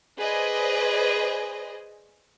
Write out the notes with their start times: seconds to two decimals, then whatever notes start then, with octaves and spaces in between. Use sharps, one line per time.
0.19 G#4 B4 C5 D5 D#5